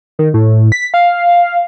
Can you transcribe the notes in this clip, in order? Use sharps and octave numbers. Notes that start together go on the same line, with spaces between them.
D#3
A2
B6
F5